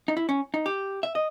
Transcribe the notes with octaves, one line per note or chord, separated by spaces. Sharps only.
D#4
E4
C#4
D#4
G4
E5
D#5